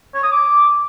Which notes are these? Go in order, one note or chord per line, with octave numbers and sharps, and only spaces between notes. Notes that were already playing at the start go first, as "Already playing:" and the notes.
C#5
D#6
D6